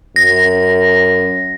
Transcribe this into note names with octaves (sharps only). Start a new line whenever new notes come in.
F#2 A#6